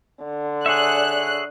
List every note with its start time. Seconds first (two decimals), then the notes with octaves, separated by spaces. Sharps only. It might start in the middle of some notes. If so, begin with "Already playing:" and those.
0.23 D3
0.66 G#4 C#5 E5 F#6